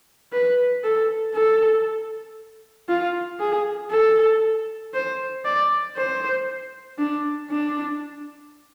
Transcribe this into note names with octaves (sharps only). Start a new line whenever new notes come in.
B4
A4
A4
F4
G#4
A4
C5
D5
C5
D4
D4